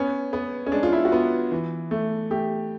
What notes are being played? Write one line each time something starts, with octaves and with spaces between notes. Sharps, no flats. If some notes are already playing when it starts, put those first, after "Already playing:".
Already playing: B3 C#4
B3
C#4
G#3 D4
F4
E4
F#4
B3 F4
E3
A3
A3 G4